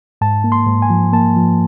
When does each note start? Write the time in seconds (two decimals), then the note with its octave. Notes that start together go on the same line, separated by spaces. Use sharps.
0.21 G#2 A5
0.44 A#3
0.52 C6
0.67 G#2
0.82 G#5
0.90 F3
1.13 A#3 A5
1.36 F3